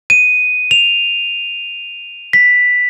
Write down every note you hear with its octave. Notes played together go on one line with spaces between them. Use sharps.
D#7
F7
B6